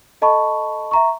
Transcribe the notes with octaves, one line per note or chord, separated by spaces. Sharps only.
A4 D#5 A5 B5 C#6
E5 A#5 C#6